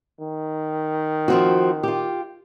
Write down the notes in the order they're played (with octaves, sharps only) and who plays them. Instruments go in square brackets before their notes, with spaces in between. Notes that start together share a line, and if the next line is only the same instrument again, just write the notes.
[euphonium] D#3
[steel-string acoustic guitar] F3 C4 F#4
F4 G4